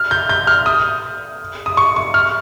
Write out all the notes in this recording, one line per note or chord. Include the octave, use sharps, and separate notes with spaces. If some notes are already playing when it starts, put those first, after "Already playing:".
Already playing: F6
G6
G6
F6
D#6
D#6
C#6
C#6
F6